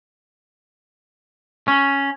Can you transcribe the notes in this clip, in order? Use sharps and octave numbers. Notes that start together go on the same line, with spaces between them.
C#4